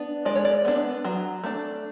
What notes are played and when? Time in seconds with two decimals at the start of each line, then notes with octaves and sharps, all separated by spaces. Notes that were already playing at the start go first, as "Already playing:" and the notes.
Already playing: B3 D4
0.25 G#3 D5
0.36 C#5
0.45 D5
0.65 B3 D4
1.05 F#3
1.44 A3 D4